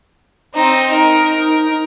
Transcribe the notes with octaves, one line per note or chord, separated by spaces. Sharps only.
C4 D#4
D#4 A#4